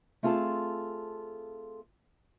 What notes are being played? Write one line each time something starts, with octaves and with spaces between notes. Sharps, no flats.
A3 C4 F4 G#4 A4 A5